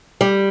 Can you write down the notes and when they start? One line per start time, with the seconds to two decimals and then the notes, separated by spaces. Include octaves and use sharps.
0.21 G3